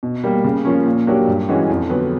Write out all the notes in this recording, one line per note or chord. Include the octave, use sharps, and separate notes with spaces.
B2
G3 A#3
C#3
F3 A#3 C#4
A#2
F#3 A#3 D4 G4
G2
E3 G#3 C#4 F#4
F2
D3 F#3 B3